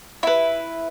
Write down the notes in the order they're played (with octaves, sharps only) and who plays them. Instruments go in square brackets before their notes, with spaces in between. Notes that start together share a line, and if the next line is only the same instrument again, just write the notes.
[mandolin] E4 B4